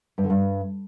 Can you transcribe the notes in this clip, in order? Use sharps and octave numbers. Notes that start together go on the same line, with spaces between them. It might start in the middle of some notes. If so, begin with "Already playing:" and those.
G2
D3
G2